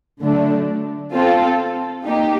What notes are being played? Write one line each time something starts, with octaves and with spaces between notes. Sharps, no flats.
D3 F#3 A3 D4
C4 F4 A4
A#3 D#4 G4